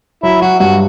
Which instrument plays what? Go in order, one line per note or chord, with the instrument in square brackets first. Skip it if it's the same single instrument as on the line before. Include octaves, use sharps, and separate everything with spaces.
[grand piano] F#3 [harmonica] E4
[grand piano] F#3 [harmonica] F#4
[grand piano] G2 [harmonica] F#4